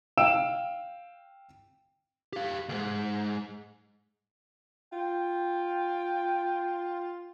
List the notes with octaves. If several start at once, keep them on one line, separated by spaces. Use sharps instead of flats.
F5 G5 E6 D7 E7
G4 F5
D2 G#2
F4 G5